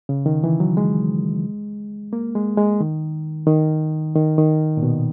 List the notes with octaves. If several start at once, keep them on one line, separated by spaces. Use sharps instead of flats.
C#3
D#3
E3
F#3
G#3
A#3
G#3
G#3
D#3
D#3
D#3
D#3
A#2
B2